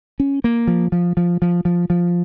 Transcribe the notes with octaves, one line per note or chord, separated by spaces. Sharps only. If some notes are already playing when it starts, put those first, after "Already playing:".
C#4
A#3
F3
F3
F3
F3
F3
F3